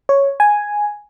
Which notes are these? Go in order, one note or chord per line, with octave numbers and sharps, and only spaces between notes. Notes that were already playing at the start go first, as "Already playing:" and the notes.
C#5
G#5